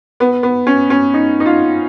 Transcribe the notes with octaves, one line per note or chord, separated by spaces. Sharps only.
B3
B3
C#4
C#4
D#4
D#4
F4